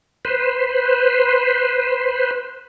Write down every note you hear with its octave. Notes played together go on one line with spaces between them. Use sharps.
B4 C5